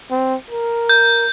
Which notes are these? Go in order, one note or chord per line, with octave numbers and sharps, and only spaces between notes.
C4
A#4
G6